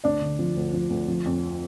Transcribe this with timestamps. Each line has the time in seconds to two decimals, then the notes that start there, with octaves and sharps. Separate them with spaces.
0.04 D2 D4 D5
0.21 D3
0.39 F3
0.56 D2
0.73 F3
0.90 D2
1.08 F3
1.26 F2